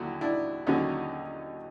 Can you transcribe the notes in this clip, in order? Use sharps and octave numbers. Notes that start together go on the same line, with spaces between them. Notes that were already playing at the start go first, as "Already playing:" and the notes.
Already playing: D#2 D3 F#3 E4 F#4
D4 E4
D#2 D3 F#3 C#4 D#4